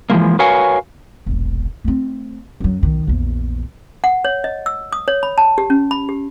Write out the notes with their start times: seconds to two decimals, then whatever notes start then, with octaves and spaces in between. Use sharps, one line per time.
0.10 E3 F3 G#3 A#3
0.39 F#4 A#4 B4 C#5 F5 G#5
1.26 E1 A#1
1.84 A3 C4
2.60 F#2 F#3
2.83 B1 D#3
3.07 A#1 E2
4.04 F#5
4.25 C#5
4.44 D#5
4.66 E6
4.93 D#6
5.08 C#5
5.23 B5
5.38 A5
5.58 G4
5.70 C#4
5.91 B5
6.09 G4